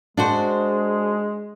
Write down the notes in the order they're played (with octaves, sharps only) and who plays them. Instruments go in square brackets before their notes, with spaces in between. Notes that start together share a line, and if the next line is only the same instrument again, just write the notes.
[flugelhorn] G#3 [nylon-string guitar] D4 F#4 C5